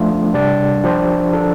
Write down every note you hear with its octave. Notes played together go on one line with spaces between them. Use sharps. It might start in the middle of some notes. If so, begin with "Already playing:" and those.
Already playing: F3 A3 D4 F4
C3 G3 D4 G4 D5
F3 D4 G4 C5
F3 D4 A4